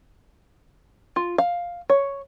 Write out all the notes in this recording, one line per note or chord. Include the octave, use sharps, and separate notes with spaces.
F4
F5
C#5